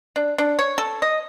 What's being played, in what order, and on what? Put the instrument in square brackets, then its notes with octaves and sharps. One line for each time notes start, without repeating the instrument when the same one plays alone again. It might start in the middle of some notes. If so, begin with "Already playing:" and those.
[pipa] D4
D4
C#5
A4
D#5